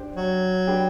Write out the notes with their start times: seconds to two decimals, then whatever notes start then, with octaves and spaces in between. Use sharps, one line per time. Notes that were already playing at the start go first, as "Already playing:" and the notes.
Already playing: D4 G4 C5 G5
0.16 F#3
0.67 D4 G4 B4